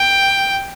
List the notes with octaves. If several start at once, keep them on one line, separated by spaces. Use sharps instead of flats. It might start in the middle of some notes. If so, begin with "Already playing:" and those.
Already playing: G5